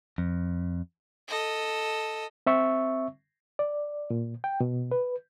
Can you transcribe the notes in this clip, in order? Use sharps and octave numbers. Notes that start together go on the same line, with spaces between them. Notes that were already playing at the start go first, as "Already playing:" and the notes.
F2
A4 D#5
C4 E5 C#6
D5
A#2
G5
B2
B4